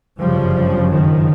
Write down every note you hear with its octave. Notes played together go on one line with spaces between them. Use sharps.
G1 F#2 C#3 F3 G3
D#3 F3